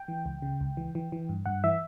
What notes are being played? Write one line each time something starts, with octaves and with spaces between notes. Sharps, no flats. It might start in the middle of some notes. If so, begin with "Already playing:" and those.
Already playing: G5
E3
C#2
C#3
C#2
E3
E3
E3
G2
G2 F#5
E3 E5